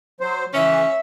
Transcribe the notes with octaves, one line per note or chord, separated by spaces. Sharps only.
F#3 C5
C#3 E3 C#4 E5